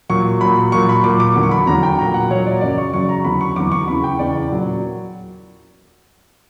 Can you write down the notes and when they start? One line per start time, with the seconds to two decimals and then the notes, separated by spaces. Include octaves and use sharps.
0.09 A#2 F#3 C#6
0.41 A#2 F#3 B5
0.72 A#2 F#3 C#6
0.89 B5
1.04 A#2 F#3 D6
1.20 D6
1.35 E2 D3 F#3
1.43 C#6
1.51 B5
1.67 E2 D3 F#3 A#5
1.83 G5
1.99 A#2 F#3 A#5
2.14 F#5
2.30 A#2 F#3 C#5
2.46 D5
2.61 F#2 C#3 F#3 D5
2.78 C#6
2.93 F#2 C#3 F#3 C#6
3.09 A#5
3.24 E2 D3 F#3 B5
3.41 C#6
3.56 E2 D3 F#3 D6
3.72 C#6
3.88 E2 C#3 E3 B5
4.04 G5
4.19 E2 C#3 E3 D5
4.51 A#2 F#3